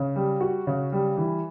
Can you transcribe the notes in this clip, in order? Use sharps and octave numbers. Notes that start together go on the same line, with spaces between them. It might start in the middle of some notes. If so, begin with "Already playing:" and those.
Already playing: C#3
G3
F#4
C#3
G3
E3